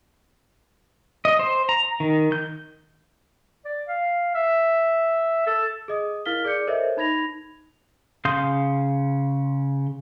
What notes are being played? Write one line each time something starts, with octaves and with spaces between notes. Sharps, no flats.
D#5
C5
A#5
D#3
G6
D5
F5
E5
A4
G#4 D#5 D#6
E4 A#4 F5 F6 B6 G7
G#4 D5 D6 G6 C#7
A4 A#4 C5 C#5 D#5 E5
D#4 B5 G#6 A#6 F7
C#3 F5 C6 D#6 G6